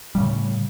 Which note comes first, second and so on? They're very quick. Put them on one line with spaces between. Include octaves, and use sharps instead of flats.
G3 C#3 A2